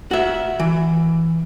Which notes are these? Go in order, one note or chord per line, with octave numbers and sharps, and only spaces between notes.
F#4 E5
E3